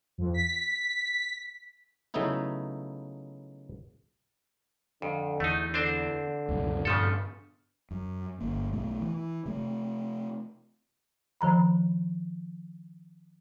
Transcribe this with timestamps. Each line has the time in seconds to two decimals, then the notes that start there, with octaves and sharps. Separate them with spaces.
0.18 F2
0.34 B6
2.14 C#3 F#3 A3 B3 D#4 E4
5.02 F2 D3
5.40 E2 A3 D#4
5.74 D3 C4 D4 C5
6.49 C#2 F#2 B2
6.85 G2 A#2 C#3 F3 B3 A4
7.91 F#2
8.40 G1 A#3
8.72 B1 A3 B3
9.01 E3
9.46 C3 A3
11.41 D#3 F3 A#5 B5